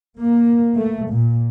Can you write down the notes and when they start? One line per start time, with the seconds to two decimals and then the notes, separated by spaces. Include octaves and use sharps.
0.19 A#3
0.75 A3
1.10 A#2